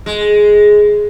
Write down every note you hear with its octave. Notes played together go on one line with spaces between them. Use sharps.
G#3